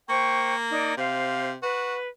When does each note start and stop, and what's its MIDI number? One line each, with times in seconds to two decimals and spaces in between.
0.09 0.93 58
0.09 0.54 72
0.09 0.54 79
0.09 0.54 85
0.72 0.94 63
0.72 0.94 74
0.97 1.56 48
0.97 1.50 72
0.97 1.50 77
1.62 1.96 66
1.62 2.07 71